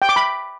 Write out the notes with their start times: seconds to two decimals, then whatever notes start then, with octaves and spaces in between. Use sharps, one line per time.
0.02 G5
0.09 D6
0.16 B5